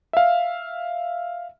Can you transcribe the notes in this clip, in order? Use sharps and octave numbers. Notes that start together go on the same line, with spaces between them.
E5 F5